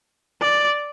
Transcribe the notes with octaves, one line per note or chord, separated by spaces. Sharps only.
D5